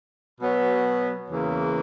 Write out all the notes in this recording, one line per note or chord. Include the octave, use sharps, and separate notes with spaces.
B2 F#3 B3
E2 C#3 E3 A#3